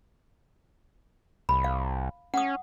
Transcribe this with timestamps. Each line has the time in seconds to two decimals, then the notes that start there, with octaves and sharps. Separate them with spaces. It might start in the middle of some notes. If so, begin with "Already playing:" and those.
1.49 C2 B5
1.64 F5
2.34 C#4 F#5 D#6